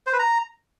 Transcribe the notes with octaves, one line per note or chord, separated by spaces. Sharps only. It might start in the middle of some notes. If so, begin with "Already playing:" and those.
C5
B4
A#5